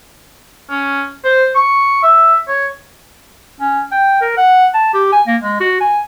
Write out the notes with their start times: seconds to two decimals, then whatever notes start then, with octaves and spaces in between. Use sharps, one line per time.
0.70 C#4
1.25 C5
1.55 C#6
2.03 E5
2.48 C#5
3.60 C#4
3.92 G5
4.21 A#4
4.37 F#5
4.74 A5
4.94 G4
5.12 G#5
5.27 A#3
5.41 G#3
5.60 F#4
5.81 G#5